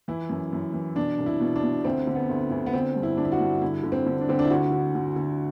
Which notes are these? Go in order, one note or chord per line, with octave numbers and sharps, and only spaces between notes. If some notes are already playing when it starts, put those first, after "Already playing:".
E3 E4
F#2
F#2
E3
B2 D4
C2
E4
B2
D4
B2
D2 C4
D3
B3
D2
D2
B3
D3 C4
G2
E4
D3 D4
E4
F#4
G2
D3 E4
D3
C4
D3
D4
D3 C4
D4
E4
D2 F#4
D3
D3
D3